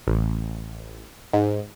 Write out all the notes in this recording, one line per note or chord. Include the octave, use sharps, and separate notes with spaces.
A1
G#2